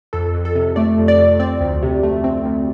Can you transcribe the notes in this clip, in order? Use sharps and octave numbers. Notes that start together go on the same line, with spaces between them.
F2 A4
F2
A4
C3
A3 D5
F2
D5
F2
C4 D5
D2
C3
A3
C4
D2